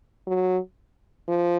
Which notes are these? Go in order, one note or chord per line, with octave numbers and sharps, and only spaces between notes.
F#3
F3